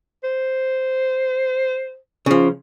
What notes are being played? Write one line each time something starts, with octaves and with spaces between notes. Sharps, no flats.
C5
C#3 F3